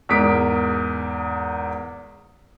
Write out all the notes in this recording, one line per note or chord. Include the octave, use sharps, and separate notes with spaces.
E2 G#2 A#4 D#6 B6 D7